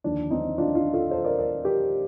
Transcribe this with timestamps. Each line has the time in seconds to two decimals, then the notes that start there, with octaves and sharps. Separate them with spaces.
0.04 D#2 D3 F3 D4
0.31 C4 D#4
0.58 D4 F4
0.75 D4 F4
0.93 F4 A4
1.11 A4 C5
1.24 A#4 D5
1.39 A#4 D5
1.65 G4 A#4